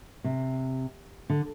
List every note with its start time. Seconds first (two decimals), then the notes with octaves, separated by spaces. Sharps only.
0.24 C3
1.30 D3